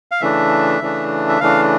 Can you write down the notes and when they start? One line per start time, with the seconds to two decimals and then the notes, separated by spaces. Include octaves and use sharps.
0.11 F5
0.21 C#3 E3 A3 D4 E5
0.81 C#3 E3 A3 D4
1.29 E5
1.40 C#3 E3 A3 D4 F5